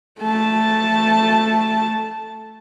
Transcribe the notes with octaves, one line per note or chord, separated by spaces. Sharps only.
A3 A5